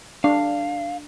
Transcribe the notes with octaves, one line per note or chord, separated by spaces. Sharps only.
D4 F5